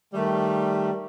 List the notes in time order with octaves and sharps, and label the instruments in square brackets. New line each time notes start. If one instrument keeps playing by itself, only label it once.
[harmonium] D#3 A3 [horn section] G3